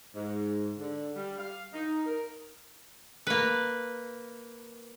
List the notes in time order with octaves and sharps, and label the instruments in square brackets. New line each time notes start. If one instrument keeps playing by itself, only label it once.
[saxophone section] G#2
D3
G3
F5
D#4
A#4
[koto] A#3 B4